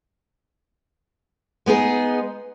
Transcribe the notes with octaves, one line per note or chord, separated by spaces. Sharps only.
G#3 B3 D#4 G#4